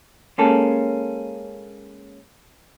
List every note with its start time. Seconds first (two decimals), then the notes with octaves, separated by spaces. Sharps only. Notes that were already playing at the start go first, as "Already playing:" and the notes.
0.38 G#3 A#3 C#4 A4